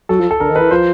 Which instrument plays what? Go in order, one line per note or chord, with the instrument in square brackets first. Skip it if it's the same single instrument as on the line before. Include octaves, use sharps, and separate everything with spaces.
[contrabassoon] F#3 [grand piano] A4
[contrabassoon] F3
[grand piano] A4
[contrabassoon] D3 [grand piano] A#4
[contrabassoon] D#3
[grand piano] B4
[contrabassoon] E3
[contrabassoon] F3 [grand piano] C5